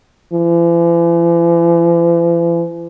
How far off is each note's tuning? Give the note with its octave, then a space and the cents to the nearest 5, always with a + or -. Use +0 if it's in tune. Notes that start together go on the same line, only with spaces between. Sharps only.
E3 +45